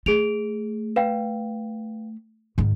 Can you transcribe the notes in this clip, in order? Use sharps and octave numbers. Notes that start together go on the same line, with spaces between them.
A3 G#4 D7 F7
B4 F5 G5
G#2 D#3